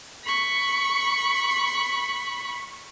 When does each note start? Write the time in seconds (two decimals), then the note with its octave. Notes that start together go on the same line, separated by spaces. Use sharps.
0.24 B5 C#6